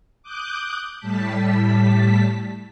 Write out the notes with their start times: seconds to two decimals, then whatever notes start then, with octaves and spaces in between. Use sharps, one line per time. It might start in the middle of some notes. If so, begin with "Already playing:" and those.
0.23 D6 D#6 F#6 G6
0.99 A2 G3 A5 B6